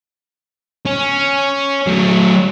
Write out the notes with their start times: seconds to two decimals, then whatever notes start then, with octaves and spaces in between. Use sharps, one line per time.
0.86 C#4
1.87 F#3 A3